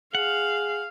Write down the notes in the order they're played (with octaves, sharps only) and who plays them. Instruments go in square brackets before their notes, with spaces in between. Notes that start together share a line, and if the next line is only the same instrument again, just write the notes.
[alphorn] G#4 [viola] F5 [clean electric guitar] F#5